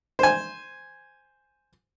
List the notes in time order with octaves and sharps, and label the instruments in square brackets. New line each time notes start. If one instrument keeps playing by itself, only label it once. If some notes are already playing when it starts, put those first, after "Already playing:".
[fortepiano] C5 G#5